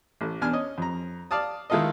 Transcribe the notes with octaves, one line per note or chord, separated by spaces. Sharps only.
A1
E2 D4 G#5 F6
C#4 D#5
F2 A#5
D5 F5 A5 D#6
D#3 G#3 E4 F4 A4 D#5